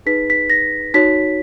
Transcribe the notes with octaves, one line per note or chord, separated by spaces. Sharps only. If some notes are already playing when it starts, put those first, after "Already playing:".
D#4 G#4 B4 B6
B6
A#6
D#4 F#4 C#5 B6